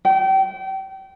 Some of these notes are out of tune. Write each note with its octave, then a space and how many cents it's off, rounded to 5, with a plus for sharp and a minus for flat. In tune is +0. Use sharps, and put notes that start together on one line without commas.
G5 -30